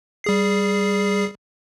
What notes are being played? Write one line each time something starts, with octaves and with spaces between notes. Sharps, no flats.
G3 G#4 C7